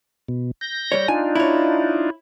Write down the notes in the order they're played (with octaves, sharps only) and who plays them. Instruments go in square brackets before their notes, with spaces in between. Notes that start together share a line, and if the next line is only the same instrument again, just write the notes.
[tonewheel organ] B2
G6 A#6
[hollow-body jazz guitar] G3 C#5
[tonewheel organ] D4 D#4 F4 [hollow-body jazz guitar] G#5
[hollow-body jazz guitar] E4 C#5